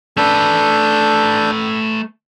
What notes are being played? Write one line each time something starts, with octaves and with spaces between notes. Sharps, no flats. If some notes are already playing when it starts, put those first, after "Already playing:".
A3 D4 A4 B4 G6